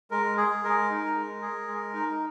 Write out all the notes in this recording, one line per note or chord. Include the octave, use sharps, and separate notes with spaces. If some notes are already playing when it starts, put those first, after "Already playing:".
G#3 A#4
G#4
G#3 A#4
D#4
G#3
G#4
G#3
D#4